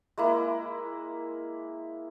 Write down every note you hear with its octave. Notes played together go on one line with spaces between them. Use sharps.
G#3 A#3 E4